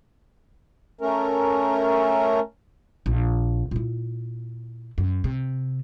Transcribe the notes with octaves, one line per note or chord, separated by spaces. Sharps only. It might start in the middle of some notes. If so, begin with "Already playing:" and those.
A3 C#4 A#4
A#1
A#2 E4
F#2
C3